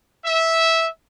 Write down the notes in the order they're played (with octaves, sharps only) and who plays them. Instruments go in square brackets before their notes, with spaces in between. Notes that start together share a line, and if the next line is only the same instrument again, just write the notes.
[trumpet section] E5